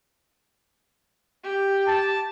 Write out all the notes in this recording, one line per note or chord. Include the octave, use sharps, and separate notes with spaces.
G4
A5